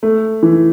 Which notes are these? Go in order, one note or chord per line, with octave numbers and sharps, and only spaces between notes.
A3
E3